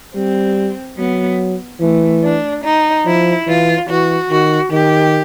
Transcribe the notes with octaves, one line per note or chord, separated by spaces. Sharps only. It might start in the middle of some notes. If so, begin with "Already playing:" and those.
G3 C4
F#3 B3
E3 A3
D4
D#4
F3 E4
E3 F4
E3 F#4
D#3 F#4
D#3 G4